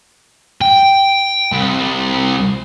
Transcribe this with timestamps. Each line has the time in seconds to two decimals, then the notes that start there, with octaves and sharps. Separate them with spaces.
0.61 G5
1.52 C2